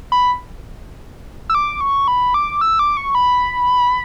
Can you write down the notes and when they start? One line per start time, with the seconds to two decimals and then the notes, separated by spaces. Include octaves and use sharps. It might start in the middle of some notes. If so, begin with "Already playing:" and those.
0.12 B5
1.50 E6
1.55 D6
1.81 C#6
2.08 B5
2.34 D6
2.61 E6
2.79 D6
2.97 C#6
3.15 B5